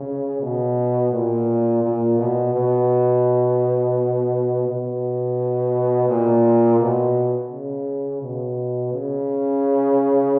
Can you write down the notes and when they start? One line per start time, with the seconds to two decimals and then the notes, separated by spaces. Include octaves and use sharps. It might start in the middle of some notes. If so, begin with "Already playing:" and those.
Already playing: C#3
0.41 B2
1.12 A#2
1.83 A#2
2.18 B2
2.54 B2
4.67 B2
6.09 A#2
6.80 B2
7.51 C#3
8.22 B2
8.93 C#3